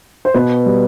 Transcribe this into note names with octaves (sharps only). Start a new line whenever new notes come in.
C5
B2 B3 B4
G3